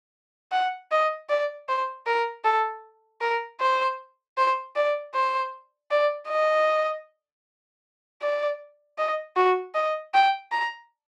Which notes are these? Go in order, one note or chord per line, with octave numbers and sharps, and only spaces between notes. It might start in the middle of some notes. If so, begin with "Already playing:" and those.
F#5
D#5
D5
C5
A#4
A4
A#4
C5
C5
D5
C5
D5
D#5
D5
D#5
F#4
D#5
G5
A#5